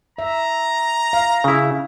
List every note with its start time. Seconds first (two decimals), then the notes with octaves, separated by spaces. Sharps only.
0.18 E5 A#5
1.13 F5
1.44 C#3 E4